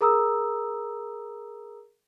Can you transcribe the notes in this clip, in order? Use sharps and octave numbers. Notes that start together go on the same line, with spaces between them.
G#4 A#4 A#5 D#6 E6